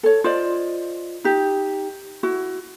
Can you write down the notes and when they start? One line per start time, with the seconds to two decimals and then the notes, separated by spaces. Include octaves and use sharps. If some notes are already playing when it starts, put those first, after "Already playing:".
0.03 A4 C#5
0.24 F4 C5 D5 D#5
1.24 D#4 G4
2.23 E4 F#4